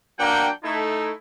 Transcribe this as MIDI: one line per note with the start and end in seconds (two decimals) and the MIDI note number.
0.19 0.49 54
0.19 0.49 58
0.19 0.49 62
0.19 0.49 78
0.19 0.49 79
0.64 1.12 57
0.64 1.12 63
0.64 1.12 64